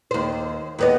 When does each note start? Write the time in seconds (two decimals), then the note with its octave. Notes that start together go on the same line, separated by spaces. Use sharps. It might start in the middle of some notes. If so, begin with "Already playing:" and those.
0.11 D#2 C5
0.79 D#2 B3 D#5